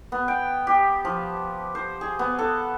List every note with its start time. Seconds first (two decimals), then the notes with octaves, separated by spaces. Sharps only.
0.12 B3
0.28 G5
0.67 G4
1.05 F3
1.75 C5
2.01 G#4
2.19 B3
2.39 A4